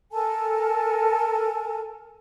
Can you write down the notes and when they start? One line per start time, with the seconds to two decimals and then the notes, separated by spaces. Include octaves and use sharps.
0.11 A4 A#4 G#5 A5